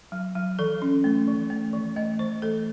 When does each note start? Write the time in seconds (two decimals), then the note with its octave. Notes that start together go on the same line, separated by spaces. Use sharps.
0.12 F#3
0.35 F#3
0.59 E3 A4
0.82 C#4
1.04 A3
1.27 E3
1.50 A3
1.73 E3
1.96 A3 D#5
2.19 E3 C5
2.42 A3 A4